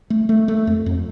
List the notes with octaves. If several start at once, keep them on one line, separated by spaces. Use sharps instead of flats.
A3
A3
A3
F2
F2